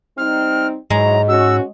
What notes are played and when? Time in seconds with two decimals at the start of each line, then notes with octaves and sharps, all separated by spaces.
0.18 G3 C4 D#4 F6
0.90 G#2 F#3 G#3 E4 A#5
1.28 C#4 F#4 E6